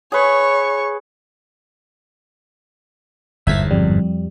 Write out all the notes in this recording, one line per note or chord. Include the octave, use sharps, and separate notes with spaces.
G#4 B4 C#5 C#6
G1 E2 G#2 E5 G#6 B6
F2 G3